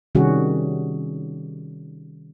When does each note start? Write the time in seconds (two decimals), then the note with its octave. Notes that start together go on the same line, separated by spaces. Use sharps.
0.15 C3 D#3 G3 C#4 F#4 G#4